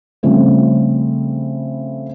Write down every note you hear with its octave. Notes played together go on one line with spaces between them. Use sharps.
C#3 F3 G3 A3 C4 C#4